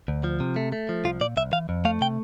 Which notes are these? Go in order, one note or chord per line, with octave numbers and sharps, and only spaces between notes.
D2
F3
C3
A3
A3
F3
C2 F4
A#2 D5
C2 E5
E3 F5
F2
A3 F5
C3 G5